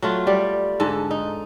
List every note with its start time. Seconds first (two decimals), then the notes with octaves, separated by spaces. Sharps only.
0.02 F#3 A3 F4
0.27 G3 D5
0.80 G#2 D3 A4
1.11 D#4